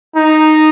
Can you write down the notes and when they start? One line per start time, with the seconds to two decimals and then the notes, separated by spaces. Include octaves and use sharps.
0.16 D#4